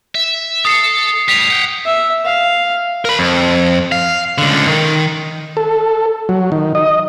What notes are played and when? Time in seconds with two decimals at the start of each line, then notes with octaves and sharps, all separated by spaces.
0.15 E5
0.65 A4 D#6 C7 C#7
1.28 A2 G3 B6 F7
1.51 F#5 G5
1.86 E5
2.25 F5
3.05 A#4 B5
3.19 F2
3.92 F5
4.38 C#2 D3
4.67 D#3
5.57 A4
6.29 F#3
6.52 D#3
6.75 D#5